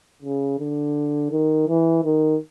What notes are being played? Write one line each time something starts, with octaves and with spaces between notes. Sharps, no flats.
C#3
D3
D#3
E3
D#3